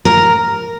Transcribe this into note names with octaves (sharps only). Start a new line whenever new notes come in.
A#4